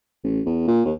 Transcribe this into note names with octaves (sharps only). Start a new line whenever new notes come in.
A1
E2
A#2
D#2